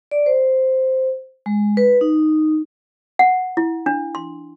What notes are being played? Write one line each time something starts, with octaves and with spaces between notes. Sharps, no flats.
D5
C5
G#3
B4
D#4
F#5
E4
D4
C6